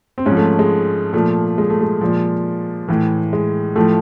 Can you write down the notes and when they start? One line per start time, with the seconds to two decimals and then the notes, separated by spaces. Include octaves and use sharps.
0.18 C4
0.26 G#2 F3 C#4
0.37 A3
0.59 G#3
1.13 A#2 F3 A3
1.58 G#3
1.70 A3
1.81 G#3
2.01 A#2 F3
2.88 A2 E3
3.33 G#3
3.75 A2 F3 A3